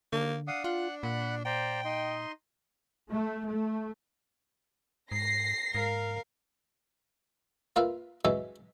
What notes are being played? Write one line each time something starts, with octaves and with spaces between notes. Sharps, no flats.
D3 A#3
D4 F5 F#5 D#6
F4 F#5 F#6
A#2 F#5 B5 F#6
C5 D5 G5 A#5
D#4 D#5 C6
A3
A3
G#2 A#6 C7
G#2 A#4 F5
A#3 F4 B4 E5 F5
E3 F#3 G#3 C#4 E5